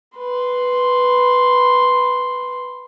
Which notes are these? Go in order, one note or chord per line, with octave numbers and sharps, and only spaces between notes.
B4 C6